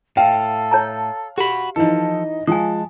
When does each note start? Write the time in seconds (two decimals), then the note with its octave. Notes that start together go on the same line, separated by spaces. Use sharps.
0.17 A2 A4 F5 G5
0.71 C#5 A5 A#5
1.38 F#4 G4 B5
1.76 E3 F3 D#4 A4 D#5
2.47 F3 G#3 G#5 A5 D#6